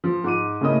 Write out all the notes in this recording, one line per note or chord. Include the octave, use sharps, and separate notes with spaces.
F3
G#2 D6 D#7
C#3 A3 A#3 E4 D#5 D#6